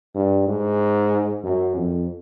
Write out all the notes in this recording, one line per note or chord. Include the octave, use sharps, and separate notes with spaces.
G2
G#2
F#2
F2